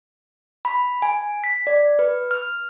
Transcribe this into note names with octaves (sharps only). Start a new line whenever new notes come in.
B5
G#5
B6
D5
B4
F6